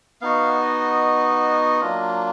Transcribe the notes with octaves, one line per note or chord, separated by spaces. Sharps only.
B3 D#4 F#4 F5
D#5
F#3 A#3 D4 F4